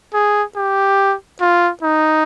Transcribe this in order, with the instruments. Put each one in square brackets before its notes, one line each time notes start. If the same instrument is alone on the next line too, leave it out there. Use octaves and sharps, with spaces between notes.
[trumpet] G#4
G4
F4
D#4